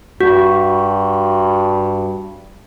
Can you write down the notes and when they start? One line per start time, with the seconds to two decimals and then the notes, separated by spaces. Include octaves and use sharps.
0.21 G2 F#4